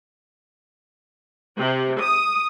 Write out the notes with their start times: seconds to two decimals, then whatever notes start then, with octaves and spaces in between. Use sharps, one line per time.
1.58 C3
2.00 D#6